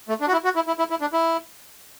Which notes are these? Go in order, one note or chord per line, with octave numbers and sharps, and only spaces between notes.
A3
D4
F#4
E4
F#4
E4
E4
E4
E4
D4
E4